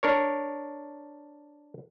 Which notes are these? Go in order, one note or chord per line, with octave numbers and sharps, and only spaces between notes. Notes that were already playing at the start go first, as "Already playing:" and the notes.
D4 A#4 C#5